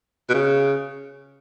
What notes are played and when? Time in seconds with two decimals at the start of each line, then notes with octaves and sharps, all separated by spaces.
0.29 B2
0.34 C#3